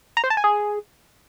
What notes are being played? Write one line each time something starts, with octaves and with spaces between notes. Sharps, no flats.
A#5
C5
A5
G#5
G#4